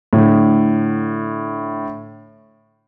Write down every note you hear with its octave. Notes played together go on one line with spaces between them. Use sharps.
A2 D3